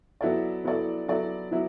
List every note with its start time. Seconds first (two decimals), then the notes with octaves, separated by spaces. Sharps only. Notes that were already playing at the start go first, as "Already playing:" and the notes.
0.21 F#3 B3 E4 A4 D5
0.64 F#3 B3 E4 A4 D5
1.08 F#3 B3 E4 A4 D5
1.52 F#3 B3 E4